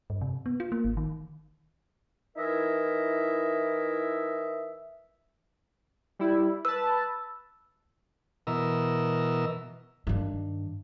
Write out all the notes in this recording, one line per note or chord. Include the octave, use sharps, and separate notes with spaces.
G2
C3
B3
F4
A#3
G#1
D#3
E3 D#4 E4 A#4 D#5 E5
G3 E4
B4 A5 E6
B2 E3 A#4 D#5 E6
G2 D#3